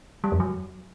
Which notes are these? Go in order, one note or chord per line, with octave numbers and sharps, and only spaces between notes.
G3
F2
F#3